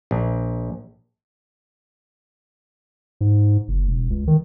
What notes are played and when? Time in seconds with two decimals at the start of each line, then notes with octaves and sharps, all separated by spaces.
0.11 A#1
3.21 G#2
3.68 F#1
3.87 E1
4.10 C#2
4.28 D#3